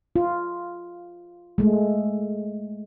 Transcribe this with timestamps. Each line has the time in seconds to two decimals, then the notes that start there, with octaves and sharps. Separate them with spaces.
0.16 F4
1.58 G#3 A3